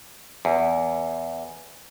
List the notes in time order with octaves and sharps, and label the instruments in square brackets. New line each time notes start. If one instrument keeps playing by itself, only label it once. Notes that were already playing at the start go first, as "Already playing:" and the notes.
[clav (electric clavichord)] E2